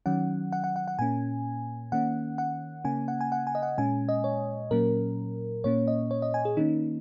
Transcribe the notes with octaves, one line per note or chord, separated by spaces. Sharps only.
D#3 F#3 C#4 F#5
F#5
F#5
F#5
F#5
A#2 A#3 C#4 G#5
D#3 A#3 C#4 F#5
F#5
C#3 A#3 C#4 G#5
F#5
G#5
F#5
G#5
D#5
F#5
A#2 G#3 C#4 G#5
D#5
C#5
A#2 F#3 A#3 C#4 A#4
A#2 A#3 C#4 C#5
D#5
C#5
D#5
G#5
G#4
D#3 A#3 C#4 D#4